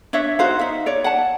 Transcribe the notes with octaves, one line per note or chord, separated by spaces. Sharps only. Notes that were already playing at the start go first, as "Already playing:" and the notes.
D4 C#5 E5
D#4 F#4 C5 F5
D#4 E5
C#5 D5
F#5 A5